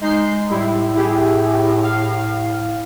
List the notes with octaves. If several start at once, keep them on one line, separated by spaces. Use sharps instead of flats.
G#3 D#4 G6 C7
A2 G3 E4
E4 G4 G#4
F5